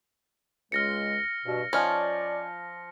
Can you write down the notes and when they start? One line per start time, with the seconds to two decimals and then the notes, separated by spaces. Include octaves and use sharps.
0.72 C#2 G#3 F6 A#6 C#7
1.45 G2 B2
1.73 F3 C#4 D#4 D5 F5